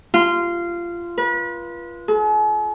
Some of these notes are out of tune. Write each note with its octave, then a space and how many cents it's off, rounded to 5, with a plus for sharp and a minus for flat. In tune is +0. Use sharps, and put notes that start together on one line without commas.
F4 -20
B4 -35
G#4 +45